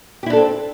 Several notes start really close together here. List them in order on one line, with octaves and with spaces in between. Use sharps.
G4 E4 D4 A4 C4